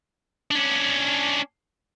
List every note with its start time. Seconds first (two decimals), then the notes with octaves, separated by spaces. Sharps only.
0.51 C#4 D4